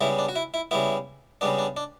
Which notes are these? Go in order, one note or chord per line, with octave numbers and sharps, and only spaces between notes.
C#3 G3 B3 E4
D4
F#4
E4
E4
C#3 G3 B3 E4
C#3 G3 B3 D4
D4
D4